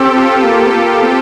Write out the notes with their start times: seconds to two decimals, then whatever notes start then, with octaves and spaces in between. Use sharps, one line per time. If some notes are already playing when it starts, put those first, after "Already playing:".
Already playing: C4 G4 A4
0.15 F4
0.43 A#3
0.66 C4
0.74 A#3
1.02 C4